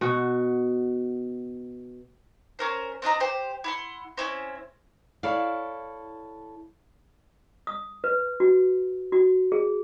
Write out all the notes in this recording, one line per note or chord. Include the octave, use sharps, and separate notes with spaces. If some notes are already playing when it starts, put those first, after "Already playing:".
B2 F#4
C#4 A#4 C5
C4 D4 D#5 A#5
G4 C5
E4 F#5 C6
C4 C#4 E4
E4 A4 C#5 D5 F5
D#6
B4
F#4
F#4
G#4